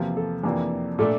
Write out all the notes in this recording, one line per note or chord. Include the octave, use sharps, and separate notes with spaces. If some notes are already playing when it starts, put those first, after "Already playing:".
Already playing: E2 C3 F3 A#3 F4
A4
F2 C3 E3 A#3 D4
A#2 A3 D4 A4